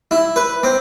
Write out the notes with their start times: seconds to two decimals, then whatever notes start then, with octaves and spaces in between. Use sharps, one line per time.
0.11 E4
0.36 B4
0.63 C4